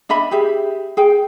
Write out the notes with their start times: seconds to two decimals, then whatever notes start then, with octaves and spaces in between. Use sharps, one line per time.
0.09 D4 D#5 E5 B5
0.31 G4 G#4 E5
0.97 G#4 G5